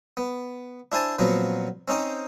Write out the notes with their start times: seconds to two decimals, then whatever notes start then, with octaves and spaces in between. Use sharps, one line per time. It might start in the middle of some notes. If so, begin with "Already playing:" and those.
0.17 B3
0.92 D4 E4 C5 G#5 A5
1.19 A#2 F3 F#3 B3 C4
1.88 C4 C#4 D#4 C5 G5